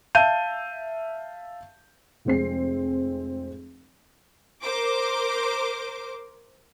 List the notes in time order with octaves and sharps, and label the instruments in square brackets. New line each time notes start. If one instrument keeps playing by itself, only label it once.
[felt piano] E5 F5 A5 G6 D#7
[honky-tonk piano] F1 G#3 C4 C7
[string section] A#4 C5 D6